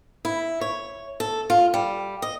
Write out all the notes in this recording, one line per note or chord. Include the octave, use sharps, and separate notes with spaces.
E4
C#5
A4
F4
G3
D#5